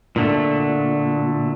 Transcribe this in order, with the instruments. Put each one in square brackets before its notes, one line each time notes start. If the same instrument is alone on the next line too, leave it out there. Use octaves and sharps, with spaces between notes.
[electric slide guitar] A#2 D3 A3